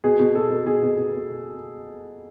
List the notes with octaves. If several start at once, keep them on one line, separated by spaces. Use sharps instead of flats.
B2 G#4
B2
B2 A4
B2
B2 G#4
B2
B2